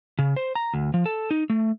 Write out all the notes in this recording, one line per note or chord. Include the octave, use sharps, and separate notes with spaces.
C#3
C5
A#5
D2
F3
A4
D#4
A3